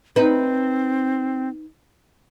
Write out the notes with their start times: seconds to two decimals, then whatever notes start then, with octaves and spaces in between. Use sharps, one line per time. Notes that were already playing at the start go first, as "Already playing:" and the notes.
0.16 C4 D#4 B4